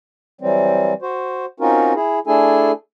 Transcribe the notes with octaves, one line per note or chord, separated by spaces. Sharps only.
E3 F#3 G3 C4
F#4 C5
C4 C#4 D#4 F4 F#4 A#4
E4 G#4
A3 D4 E4 G#4 A4 G#5